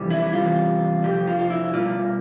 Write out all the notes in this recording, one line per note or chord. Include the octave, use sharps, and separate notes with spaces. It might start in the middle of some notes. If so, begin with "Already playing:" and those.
Already playing: F2 C3 E3 G3
E4
E2 C3 G3 F4
F2 C3 F3 G4
F4
F4
E4
B2 G3 F4